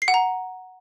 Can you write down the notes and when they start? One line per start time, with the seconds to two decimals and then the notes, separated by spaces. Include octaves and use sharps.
0.02 C7
0.08 F#5
0.14 A#5